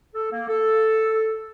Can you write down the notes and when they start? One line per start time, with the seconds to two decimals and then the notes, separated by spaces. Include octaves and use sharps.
0.14 A4
0.31 A#3
0.47 A4